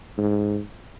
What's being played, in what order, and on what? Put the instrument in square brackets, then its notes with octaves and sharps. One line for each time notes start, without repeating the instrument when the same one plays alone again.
[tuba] G#2